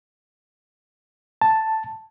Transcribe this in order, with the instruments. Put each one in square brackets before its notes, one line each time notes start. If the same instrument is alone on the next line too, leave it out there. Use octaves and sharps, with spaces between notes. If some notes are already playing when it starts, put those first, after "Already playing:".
[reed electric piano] A5